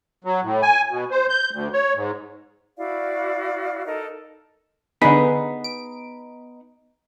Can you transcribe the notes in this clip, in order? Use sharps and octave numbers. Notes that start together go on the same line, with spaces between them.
F#3
A2
G#5
B2
C5
G6
D2
C#5
G#2
E4 F#4 D5 F5
D#4 A4 A#4 D#5
D3 B3 D#4 G#4 B4
D7